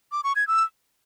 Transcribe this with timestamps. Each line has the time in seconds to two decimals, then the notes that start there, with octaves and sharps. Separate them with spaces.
0.12 D6
0.24 C#6
0.36 G#6
0.48 E6